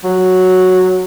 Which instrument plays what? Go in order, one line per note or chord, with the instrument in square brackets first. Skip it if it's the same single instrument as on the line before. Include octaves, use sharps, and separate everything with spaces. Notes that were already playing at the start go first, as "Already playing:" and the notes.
[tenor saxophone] F#3